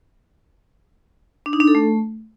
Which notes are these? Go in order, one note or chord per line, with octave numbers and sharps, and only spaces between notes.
D4
D#4
D4
A4
A3